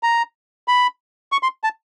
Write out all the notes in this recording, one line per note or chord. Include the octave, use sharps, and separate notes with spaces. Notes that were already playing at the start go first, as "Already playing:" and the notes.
A#5
B5
C#6
C6
A5